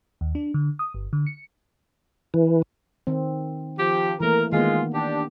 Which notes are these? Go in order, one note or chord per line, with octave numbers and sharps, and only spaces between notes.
D#2
D4
D3
D#6
G1
D3
C#7
E3
D#3 C4
F3 G4
E3 A3 A#3 A#4
D#3 G#3 A#3 B3 F4
D4 G4